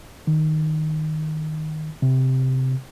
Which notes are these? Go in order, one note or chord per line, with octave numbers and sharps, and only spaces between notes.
D#3
C3